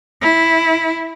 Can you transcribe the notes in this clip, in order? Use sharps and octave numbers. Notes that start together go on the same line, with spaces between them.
E4